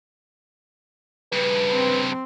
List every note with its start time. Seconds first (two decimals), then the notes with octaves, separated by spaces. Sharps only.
1.32 G2 C#3 B4
1.72 C4